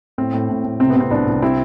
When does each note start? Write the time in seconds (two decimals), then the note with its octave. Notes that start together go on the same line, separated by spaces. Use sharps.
0.18 A2 C4
0.33 A2
0.49 A2
0.64 A2
0.80 C3 C4
0.90 B3
0.95 C3 C4
1.10 C2 B3 D4
1.27 C2
1.42 C3 C4 E4